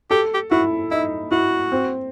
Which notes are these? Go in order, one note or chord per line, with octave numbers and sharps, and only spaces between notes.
G4 A4
G4
E4 F#4
D#4 E4
E4 F#4
C4